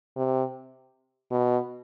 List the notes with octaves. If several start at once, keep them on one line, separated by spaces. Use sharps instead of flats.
C3
B2